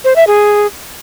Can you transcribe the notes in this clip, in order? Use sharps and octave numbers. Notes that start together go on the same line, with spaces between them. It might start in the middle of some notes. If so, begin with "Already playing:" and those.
C5
E5
G#4